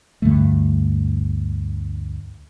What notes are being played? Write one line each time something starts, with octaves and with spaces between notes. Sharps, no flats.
D2 G2 D3 A3